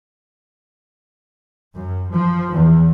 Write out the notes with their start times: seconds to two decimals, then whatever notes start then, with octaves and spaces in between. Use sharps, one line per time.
1.75 F#2
2.13 F3
2.52 E2